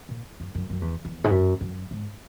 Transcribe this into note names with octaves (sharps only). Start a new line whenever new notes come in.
A#2
F#2
F#2
F#2
E2
E2
G#2
F#2
F#2
G#2